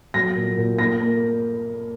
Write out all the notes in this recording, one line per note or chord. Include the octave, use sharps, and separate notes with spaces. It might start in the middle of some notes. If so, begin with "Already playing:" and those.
F#3 A#6
A#2
A#2
A#3 A#6
A#3